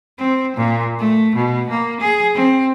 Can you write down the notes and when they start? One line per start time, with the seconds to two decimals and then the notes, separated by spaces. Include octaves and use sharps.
0.18 C4
0.57 A#2
0.99 A3
1.35 B2
1.70 A#3
2.00 G#4
2.35 C4